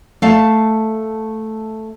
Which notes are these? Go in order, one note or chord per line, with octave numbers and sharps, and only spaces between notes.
A3 F5 A5